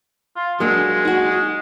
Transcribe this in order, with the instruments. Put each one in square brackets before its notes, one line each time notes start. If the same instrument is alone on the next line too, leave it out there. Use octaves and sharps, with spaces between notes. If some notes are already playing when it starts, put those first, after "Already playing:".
[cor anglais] F4
[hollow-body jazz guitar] F#3 A#3 D4 [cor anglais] G#3
[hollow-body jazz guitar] D#4 F#4